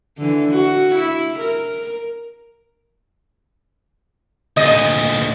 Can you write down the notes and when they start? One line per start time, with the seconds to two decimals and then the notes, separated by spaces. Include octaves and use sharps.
0.18 D3 E3
0.50 F#4
0.95 E4
1.39 A#4
4.57 D2 A#2 D#5